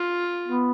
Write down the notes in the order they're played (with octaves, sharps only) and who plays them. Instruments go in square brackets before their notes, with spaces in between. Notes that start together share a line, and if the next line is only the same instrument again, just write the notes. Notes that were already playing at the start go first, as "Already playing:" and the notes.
Already playing: [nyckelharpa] F4
[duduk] B3